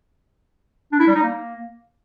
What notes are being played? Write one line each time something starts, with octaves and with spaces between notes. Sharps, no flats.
D4
E4
G3
D#4
A#3